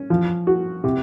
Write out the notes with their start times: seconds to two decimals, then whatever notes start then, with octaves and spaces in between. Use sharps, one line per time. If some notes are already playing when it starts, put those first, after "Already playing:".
Already playing: C#4
0.10 F3
0.47 F#4
0.84 C3